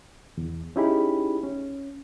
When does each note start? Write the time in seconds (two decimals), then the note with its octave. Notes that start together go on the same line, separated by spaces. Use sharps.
0.38 E2
0.76 C#4 D#4 E4 G4 G#4 B5
1.43 C#4